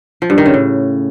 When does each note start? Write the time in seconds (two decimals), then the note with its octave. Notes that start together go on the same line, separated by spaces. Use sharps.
0.22 F3
0.30 G2
0.38 D#3
0.46 C#3
0.54 A2